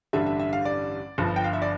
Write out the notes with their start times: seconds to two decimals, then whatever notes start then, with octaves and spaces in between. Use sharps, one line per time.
0.13 A1 G2 D3 G3 E5
0.26 E5
0.39 E5
0.53 F5
0.65 D5
1.18 G1 G2 F3
1.36 G5
1.44 F5
1.53 E5
1.62 D5